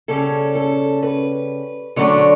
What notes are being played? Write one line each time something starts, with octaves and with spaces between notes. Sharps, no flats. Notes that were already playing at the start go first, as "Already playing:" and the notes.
C#3 G3 C#4 A4
A4
B4
D3 F#3 A3 D4 C#5